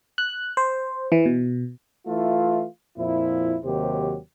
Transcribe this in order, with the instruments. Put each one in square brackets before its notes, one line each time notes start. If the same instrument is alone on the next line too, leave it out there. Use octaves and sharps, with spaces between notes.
[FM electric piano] F#6
C5
E3
B2
[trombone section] E3 A3 E4 F4
F2 A#2 F3 E4
D#2 C3 D#3 F#3 G4 C5